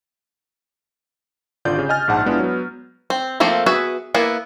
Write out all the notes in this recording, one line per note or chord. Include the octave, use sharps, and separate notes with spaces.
G#1 D3 F4 D5 G6
C#3 G4
D#5 G#5 F6 A6
A#1 G#2 F#5 A5
G#3 B3 D4 E4 F4 G#4
F#3 B3
C4
F3 A3 A#3 C4
B3 F#4 G#4 E5
A#3 B3 E4